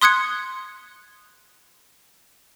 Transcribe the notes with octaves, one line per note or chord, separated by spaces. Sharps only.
C6 D#6 F#6 G#6 C#7